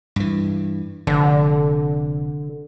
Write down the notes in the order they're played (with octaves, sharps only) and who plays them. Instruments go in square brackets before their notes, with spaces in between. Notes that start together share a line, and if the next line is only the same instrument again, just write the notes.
[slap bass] G2 E3
[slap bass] F1 [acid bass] D3